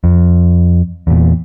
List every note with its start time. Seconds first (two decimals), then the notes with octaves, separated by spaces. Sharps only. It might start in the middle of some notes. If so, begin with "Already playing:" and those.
0.04 F2
1.07 E2 A#2